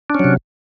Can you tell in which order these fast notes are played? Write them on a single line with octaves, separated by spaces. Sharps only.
D4 C#4 F#3 C3